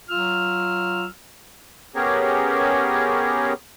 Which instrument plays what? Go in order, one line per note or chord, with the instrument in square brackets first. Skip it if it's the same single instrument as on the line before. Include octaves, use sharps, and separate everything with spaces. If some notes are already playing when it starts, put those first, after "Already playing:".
[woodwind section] F#3 F4 E6 F6
[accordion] B3 C#4 G4 G#4 A#4 C#5